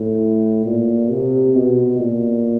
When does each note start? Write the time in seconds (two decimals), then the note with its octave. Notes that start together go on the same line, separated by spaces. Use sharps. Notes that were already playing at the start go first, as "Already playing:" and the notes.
Already playing: A2
0.66 A#2
1.11 C3
1.55 B2
2.00 A#2